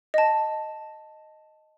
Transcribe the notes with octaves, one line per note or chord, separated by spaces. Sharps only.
D#5 A5